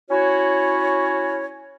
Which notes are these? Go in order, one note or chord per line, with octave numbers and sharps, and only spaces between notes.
C#4 E4 F#4 C#5